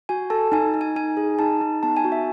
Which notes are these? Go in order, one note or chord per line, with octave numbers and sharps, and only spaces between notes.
F#4 G#5
A4 A5
D#4 G#5
D#4
G#5
D#4 G#5
G#4
D#4 A5
D#4
B3 A5
G#5
F#4
E5